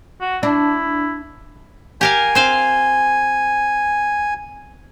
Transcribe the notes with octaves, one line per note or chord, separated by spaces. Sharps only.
F#4
D4 E4
G4 A#4 F5 G#5
C4 C5 F5